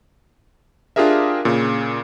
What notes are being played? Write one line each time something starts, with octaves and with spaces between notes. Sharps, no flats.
D4 F4 G4 G#4 A#4 E5
A#2 C#3